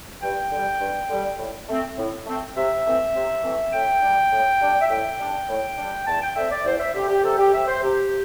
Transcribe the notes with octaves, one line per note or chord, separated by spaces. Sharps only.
G2 G5
D3 G3
G2
D3 G3
A2
A3 C4
A2
A3 C4
C3 E5
E3 A3 C4
C3
E3 A3 C4
A2 G5
G3 D4
A2
G3 D4
E5
A2 G5
G3 D4
A2
G3 D4
E2 A5
G5
D3 C4 E5
D5
E2 C5
E5
D3 C4 G4
G4
C3 A4
G4
G3 C4 E5
C5
C3 G4